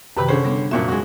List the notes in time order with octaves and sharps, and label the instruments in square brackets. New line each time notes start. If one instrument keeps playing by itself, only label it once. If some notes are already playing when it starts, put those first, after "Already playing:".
[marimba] F#2 C3 D#3 [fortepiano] G4 B4 B5
[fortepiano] D3 C#4 C5 [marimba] G#4
[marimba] G3 B3 D4
[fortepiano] F2 A#2 F#3 [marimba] E5
[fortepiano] G#3 F#4